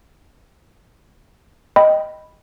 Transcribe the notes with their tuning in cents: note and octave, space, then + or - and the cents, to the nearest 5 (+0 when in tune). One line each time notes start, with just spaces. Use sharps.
D#5 +0 G5 +0 B5 +0